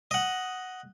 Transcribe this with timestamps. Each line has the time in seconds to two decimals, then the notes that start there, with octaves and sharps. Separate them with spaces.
0.11 D#5 F#5